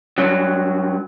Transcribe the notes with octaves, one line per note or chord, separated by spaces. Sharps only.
G2 F#3